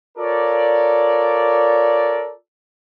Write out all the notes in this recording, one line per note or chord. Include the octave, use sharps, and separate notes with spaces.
F4 A4 A#4 C#5 D5